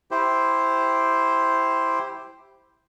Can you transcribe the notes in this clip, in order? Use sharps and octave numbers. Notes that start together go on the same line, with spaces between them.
E4 G4 C5